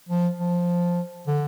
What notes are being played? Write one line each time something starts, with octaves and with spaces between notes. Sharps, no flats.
F3
F3
D3